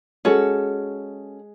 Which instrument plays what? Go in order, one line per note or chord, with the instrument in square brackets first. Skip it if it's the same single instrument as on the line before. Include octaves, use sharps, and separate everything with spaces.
[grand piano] G#3 G#4 [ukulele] C#4 F#4 A4